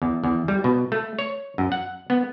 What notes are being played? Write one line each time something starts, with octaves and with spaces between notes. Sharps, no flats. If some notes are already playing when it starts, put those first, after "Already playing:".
E2
E2
G3
B2
A3
C#5
F#2
F#5
B3